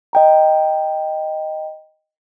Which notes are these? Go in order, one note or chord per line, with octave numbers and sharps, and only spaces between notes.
D#5 G5 A#5